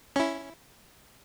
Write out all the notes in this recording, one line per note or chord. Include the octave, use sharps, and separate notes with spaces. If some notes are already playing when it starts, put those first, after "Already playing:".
C#4 E4